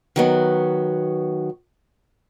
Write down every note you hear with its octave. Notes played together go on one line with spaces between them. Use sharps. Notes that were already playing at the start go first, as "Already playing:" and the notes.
D#3 F#3 B3